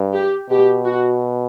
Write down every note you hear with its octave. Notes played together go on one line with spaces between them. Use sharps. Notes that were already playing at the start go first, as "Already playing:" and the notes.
Already playing: G2
G4
B2 G4
F#4